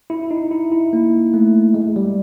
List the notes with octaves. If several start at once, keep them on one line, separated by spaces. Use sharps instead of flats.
E4
D#4
E4
E4
A#3
A3
G#3
G3